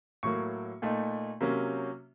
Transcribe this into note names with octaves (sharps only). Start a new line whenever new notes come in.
A2 F#3 A#3 C#6
A#2 A3 D#4
C3 F#3 A#3 C#4